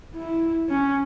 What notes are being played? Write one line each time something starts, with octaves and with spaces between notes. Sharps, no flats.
E4
C#4